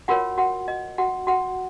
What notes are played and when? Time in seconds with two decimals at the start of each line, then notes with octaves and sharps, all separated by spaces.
0.08 F4 F#4 A#4 C#5 F#5
0.38 F#4 F#5
0.68 D#5
0.98 F#4 F#5
1.27 F#4 F#5